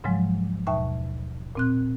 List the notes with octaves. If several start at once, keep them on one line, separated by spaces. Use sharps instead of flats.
G#2 C#3 F3 F#3 G#3
D#2 B2 E5 G5 A5 C#6
A#2 C4 F#6